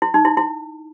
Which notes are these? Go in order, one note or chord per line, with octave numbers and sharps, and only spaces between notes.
E4
D#4
E4
E4